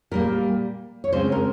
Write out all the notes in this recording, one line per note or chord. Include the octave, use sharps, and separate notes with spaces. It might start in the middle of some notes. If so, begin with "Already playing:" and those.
A#2 G3 A#3 A#4
C#5
C#3 G#3 C4 C5
A#4